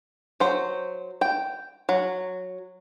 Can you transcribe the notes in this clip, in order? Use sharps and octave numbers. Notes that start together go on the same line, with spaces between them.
F#3 C5
G5
F#3